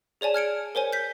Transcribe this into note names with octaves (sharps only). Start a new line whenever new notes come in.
G#4 C#5 D5 G#5 A5
F6 G#6 C#7 D7
A#4 C5 C#5 G#5
G6 B6